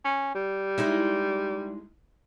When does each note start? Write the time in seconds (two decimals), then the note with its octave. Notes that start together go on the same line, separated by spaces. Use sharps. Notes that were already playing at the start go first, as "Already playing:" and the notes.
0.05 C#4
0.35 G3
0.78 G#3 D#4 E4